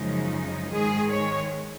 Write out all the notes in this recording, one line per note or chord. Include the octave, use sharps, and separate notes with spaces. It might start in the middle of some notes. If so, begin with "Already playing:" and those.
Already playing: F#2 C#3 F3 G#3 D#4
G#2 D#3 G#3 G#4
C#5